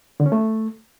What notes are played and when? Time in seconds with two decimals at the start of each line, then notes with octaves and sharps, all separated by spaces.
0.20 D3
0.26 C#4
0.32 A3